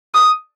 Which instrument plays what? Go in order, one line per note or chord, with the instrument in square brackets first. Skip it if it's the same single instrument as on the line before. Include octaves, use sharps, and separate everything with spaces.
[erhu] D#6